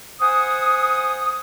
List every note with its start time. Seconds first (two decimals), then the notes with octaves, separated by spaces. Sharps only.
0.20 C5 F#5 G#5 D#6